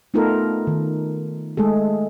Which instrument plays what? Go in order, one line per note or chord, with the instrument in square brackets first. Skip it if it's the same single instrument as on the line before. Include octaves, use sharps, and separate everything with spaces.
[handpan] A3 B3 D#4 F4 A4 A#4
D#3
G#3 A3 G#4 A4